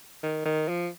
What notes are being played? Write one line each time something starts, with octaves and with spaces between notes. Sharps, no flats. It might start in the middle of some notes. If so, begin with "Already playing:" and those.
D#3
D#3
F3